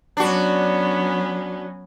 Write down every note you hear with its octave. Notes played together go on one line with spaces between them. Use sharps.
F#3 B3 C#4 D4 F#4